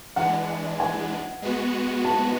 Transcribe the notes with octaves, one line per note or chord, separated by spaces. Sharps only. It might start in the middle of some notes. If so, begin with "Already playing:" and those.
E3 G#3 D4 F#5
G#5
G#3 B3 F#4
A5